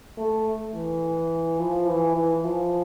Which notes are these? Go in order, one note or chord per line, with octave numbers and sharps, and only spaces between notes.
A3
E3
F3
E3
E3
F3